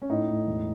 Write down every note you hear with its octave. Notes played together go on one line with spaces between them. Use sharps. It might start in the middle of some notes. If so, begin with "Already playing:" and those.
C#4
A2 D#4
A2
E1